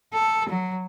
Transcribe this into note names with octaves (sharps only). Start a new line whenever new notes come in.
A4
F#3